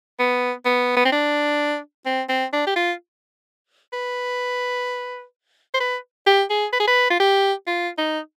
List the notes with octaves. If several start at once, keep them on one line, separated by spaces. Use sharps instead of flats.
B3
B3
B3
C4
D4
C4
C4
D4
G4
F4
B4
C5
B4
G4
G#4
B4
G#4
B4
F4
G4
F4
D#4